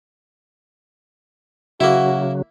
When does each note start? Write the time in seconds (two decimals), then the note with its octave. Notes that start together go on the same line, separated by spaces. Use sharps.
1.81 C#3 F#3 A#3 E4 F#4